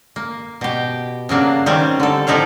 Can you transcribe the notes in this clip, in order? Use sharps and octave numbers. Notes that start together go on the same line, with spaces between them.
A#3
B2 G4
C#3 F#3 A#3 D4
D#3 G3 C4 C#4
D3 A4
A2 F3 D#4 E4 D5 F5